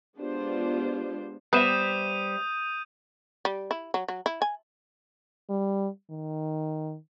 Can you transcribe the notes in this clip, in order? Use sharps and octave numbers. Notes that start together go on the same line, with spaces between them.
G#3 B3 D4 F4 G4 C5
G3 B3 B4 C5 E5 D#6 G6 D#7
G3
E4
F#3
F#3
E4
G#5
G3
D#3